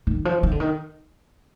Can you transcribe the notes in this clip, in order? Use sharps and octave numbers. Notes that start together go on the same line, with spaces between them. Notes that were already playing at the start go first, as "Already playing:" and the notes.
D#3
F3
D#3
D3
D#3